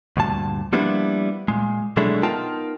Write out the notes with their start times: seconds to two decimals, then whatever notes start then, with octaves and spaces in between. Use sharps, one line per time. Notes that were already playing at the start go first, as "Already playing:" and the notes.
0.17 D2 G2 A#2 A5
0.73 F3 G3 A#3 B3 D4 E4
1.48 A#2 G#3
1.97 B2 F#3 G#3 A3 D4 E4
2.23 B3 D#4 F4 A#4 G5 A5